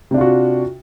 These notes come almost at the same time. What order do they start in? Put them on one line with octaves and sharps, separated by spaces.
C3 D4 F4 F#4